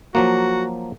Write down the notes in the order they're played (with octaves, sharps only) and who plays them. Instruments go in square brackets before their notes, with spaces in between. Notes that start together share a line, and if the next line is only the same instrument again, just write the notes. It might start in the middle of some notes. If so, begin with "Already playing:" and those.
[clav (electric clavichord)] F3 F#3 A#3 [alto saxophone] F#4